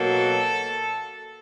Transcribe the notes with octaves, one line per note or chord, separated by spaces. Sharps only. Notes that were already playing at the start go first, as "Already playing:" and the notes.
Already playing: B2 F#3 A#3 A4